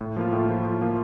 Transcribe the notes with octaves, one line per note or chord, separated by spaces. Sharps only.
A2
F3 A#3 F4
A2
F3 A#3 F4
A2
F3 A#3 F4